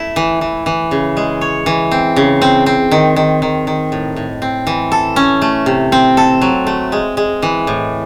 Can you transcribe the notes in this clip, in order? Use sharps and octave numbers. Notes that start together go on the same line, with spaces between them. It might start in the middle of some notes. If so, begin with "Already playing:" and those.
Already playing: A3 E4
E3
E3
E3
C#3
G#3
C#5
E3
C4
C#3
C4
C4
D#3
D#3
D#3
D#3
A2
A2
C4
E3
A4
C#4
A3
C3
C4
A4
F#3
A3
G#3
G#3
E3
A2